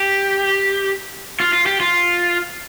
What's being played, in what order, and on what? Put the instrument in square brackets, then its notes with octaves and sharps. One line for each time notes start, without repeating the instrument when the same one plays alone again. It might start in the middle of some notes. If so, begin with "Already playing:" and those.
Already playing: [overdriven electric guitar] G4
F4
F4
G4
F4